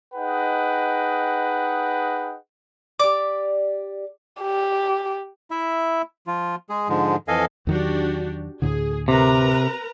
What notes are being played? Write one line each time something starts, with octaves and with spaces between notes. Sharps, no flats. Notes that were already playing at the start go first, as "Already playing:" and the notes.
D#4 G#4 B4 D#5 F#5 G5
G4 D5 D6
G4
E4 E5
F3 F4
G#3 G#4
G#2 D3 F3 G#3
F2 E3 A4 D#5 F5 G#5
E2 D#3 F#3 D4 F#4 G4
D2 A2 D3 G#4
C3 A#4 B4 A#5